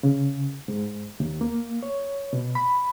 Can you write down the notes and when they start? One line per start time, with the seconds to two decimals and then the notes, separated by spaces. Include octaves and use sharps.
0.03 C#3
0.68 G#2
1.20 D#2
1.41 A#3
1.83 C#5
2.33 B2
2.55 B5